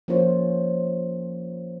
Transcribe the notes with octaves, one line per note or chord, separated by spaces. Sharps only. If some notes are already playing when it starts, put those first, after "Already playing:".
F3 A#3 C#4 F4 C5 C#5